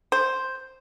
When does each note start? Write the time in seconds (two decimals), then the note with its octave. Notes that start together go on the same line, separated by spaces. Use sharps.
0.12 C5